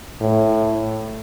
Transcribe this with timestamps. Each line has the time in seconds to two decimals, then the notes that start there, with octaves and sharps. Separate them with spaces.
0.21 A2